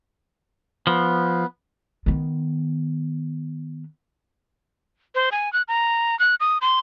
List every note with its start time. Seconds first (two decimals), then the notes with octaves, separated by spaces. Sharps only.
0.87 F3 B3
2.06 D#3 B3
5.15 C5
5.32 G#5
5.53 F#6
5.68 A#5
6.19 F#6
6.40 D#6
6.61 C6